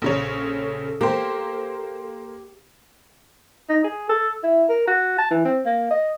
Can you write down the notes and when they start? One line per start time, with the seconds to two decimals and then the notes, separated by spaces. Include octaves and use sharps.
0.02 A#1 C#3 A4 C#5
1.01 A#3 G4 A#4 C5
3.69 D#4
3.84 G#4
4.09 A4
4.43 E4
4.69 A#4
4.88 F#4
5.18 A5
5.31 E3
5.45 C4
5.65 A#3
5.91 D#5